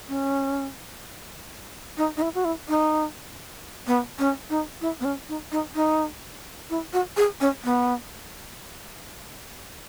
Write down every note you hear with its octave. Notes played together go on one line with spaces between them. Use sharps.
C#4
D#4
D#4
E4
F#4
E4
D#4
B3
C#4
D#4
E4
B3
C#4
D#4
D#4
D#4
E4
F#4
G#4
C#4
B3